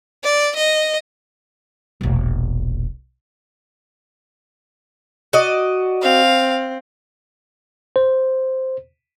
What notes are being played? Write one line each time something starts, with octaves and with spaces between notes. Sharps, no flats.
D5
D#5
E1 A#1
F#4 D5 D#5
C4 F5
C5